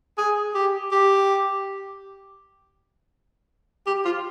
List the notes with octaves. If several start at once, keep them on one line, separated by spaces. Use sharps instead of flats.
G#4
G4
G4
G4
F4